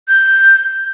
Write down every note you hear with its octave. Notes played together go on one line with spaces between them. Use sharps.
G6